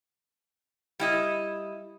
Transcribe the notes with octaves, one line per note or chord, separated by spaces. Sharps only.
G3 E4 D#5